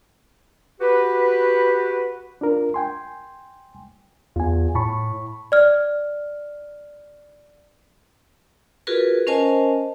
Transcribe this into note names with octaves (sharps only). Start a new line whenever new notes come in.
F#4 G4 B4
D4 F4 A#4
G5 G#5 C6
E2 F4 G#5
A2 A5 B5 C#6
D5 F6
F4 F#4 G#4 A#4 B4
C#4 A#4 C5 D#5 G#5 A5